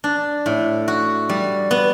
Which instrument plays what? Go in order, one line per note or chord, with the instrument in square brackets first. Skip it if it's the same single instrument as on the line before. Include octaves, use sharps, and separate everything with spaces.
[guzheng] D4
A2
F#4
G3
B3